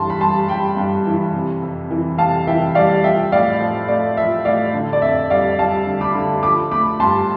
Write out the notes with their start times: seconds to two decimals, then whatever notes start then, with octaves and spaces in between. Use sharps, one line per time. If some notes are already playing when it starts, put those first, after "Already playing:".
Already playing: G2 E3 A5 C6
0.10 B5
0.20 G3 A5 C6
0.48 G3 G5 B5
0.77 G2
1.06 E3
1.34 C3
1.62 F2
1.91 E3
2.18 C3 F5 A5
2.47 E3 E5 G5
2.75 G3 D5 F5
3.04 F3 E5 G5
3.32 A2 D5 F5
3.60 F3
3.88 A3 D5
4.17 F3 E5
4.45 A2 D5 F5
4.74 D3
4.93 D5
5.02 F2 E5
5.30 G3 D5 F5
5.58 G3 F5 A5
5.87 D3
6.01 B5 D6
6.15 D3
6.43 F3 B5 D6
6.72 A3 B5 D6
7.00 G2 A5 C6